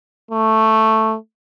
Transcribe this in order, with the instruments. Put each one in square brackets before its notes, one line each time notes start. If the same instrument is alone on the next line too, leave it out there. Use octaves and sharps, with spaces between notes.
[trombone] A3